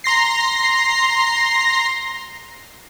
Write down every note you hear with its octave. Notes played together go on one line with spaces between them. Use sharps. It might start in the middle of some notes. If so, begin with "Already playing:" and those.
A#5 C6 A#6 C7